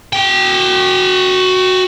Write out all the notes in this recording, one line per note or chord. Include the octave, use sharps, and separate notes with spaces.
F#4 G5